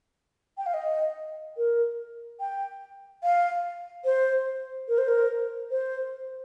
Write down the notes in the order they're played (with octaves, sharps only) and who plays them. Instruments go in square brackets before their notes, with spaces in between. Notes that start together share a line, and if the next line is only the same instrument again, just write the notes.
[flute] G5
F5
D#5
A#4
G5
F5
C5
A#4
C5
A#4
C5